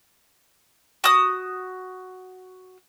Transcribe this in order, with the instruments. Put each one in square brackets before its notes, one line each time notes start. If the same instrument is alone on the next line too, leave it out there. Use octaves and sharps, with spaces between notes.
[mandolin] F#4 D#6